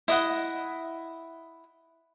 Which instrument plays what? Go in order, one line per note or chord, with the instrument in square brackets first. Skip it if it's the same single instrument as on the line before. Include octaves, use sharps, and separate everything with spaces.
[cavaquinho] E4 D#5 F#5